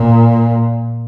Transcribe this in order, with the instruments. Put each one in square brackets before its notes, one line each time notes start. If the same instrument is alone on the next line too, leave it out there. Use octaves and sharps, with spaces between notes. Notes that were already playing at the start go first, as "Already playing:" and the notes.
Already playing: [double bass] A#2